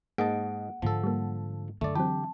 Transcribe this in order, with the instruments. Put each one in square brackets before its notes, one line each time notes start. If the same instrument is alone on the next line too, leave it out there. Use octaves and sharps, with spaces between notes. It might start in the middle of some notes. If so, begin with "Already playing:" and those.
[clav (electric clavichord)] G#2 D#5 A5 [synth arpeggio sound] A#3 G#4 D7 [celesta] F#5
[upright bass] G#2 D3 [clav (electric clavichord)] F3 A4
[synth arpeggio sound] G3 A#3
[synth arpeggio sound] F#2 [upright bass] D3 [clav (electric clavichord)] A3 D5
[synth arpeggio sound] E3 F#3 C4 [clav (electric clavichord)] G4 [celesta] A5